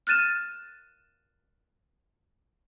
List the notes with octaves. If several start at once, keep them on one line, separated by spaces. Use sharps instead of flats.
F6 F#6 A6 D#7 E7